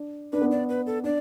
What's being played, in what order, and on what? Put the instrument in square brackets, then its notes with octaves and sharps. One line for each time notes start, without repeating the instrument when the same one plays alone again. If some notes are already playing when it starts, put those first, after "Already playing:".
Already playing: [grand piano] D4
[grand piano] D4 [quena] B4
[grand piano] B3
[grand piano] D4 [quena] D5
[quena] B4
A4
[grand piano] D4 [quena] D5